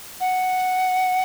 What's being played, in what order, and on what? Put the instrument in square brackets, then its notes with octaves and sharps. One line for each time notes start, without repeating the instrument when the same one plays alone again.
[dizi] F#5